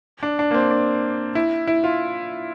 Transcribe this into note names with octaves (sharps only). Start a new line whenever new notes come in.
D4
D4
A#3
C4
D4
E4
E4
F4